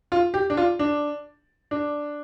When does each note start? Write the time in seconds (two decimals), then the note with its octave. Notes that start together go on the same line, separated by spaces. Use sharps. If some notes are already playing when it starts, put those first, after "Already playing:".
0.12 F4
0.34 G4
0.50 D4
0.57 F4
0.79 D4
1.71 D4